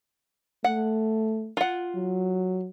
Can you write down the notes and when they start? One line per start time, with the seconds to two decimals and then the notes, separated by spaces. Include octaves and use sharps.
0.64 A3 F#5
1.57 F4 F#5
1.95 F#3